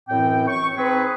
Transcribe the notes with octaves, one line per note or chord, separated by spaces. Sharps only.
F#2 A2 E3 C4 G5
C#6
C4 D#4 G#4 B4